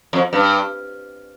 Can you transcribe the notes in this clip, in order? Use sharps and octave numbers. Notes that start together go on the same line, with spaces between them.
F2
G2